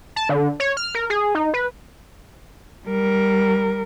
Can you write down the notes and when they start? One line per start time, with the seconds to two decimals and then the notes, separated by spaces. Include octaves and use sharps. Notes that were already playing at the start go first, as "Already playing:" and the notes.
0.16 A5
0.29 D3
0.60 C#5
0.77 F6
0.95 A#4
1.10 G#4
1.35 D#4
1.54 B4
2.87 G3 A#4